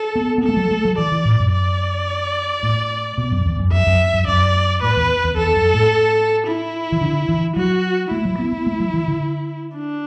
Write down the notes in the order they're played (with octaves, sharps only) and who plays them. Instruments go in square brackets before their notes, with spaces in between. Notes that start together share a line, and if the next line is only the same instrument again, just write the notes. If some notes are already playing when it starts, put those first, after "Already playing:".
Already playing: [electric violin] A4
[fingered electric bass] B3
B3
[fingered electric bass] A3 [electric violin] A4
[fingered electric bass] F#3
A3
F#3
[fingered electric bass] E3 [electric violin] D5
[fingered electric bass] E3
A2
F#2
[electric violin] D5
[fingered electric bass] A2
B2
F#2
E2
F#2
[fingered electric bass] F#2 [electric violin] E5
[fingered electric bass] F#2
F#2
[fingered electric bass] F#2 [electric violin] D5
[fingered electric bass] A2 [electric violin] B4
[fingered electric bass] E2
E2
[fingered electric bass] E2 [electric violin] A4
[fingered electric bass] F#2
A2
[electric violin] E4
[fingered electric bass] E3
D3
E3
[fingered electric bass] F#3 [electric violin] F#4
[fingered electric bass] A3 [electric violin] E4
[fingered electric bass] F#3
B3
B3
A3
F#3
E3
D3
[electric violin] D4